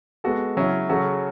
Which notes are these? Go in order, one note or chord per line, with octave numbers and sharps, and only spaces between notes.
G#3 B3 F#4 A4
C#3 F#3 C#4 E4
C#3 F#3 C#4 F#4 A4